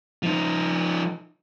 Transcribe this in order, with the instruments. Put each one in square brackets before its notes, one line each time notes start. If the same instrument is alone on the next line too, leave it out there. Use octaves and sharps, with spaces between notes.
[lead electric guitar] F3 D#4